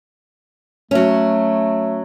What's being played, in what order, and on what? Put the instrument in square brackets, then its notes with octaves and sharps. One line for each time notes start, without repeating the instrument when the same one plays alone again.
[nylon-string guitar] F#3 C#4 [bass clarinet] A3